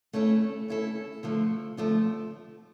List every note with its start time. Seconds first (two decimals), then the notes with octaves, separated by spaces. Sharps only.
0.13 A3 C#4 E4 A4
0.68 A3 C#4 E4 A4
1.23 D3 F3 A3
1.77 D3 F3 A3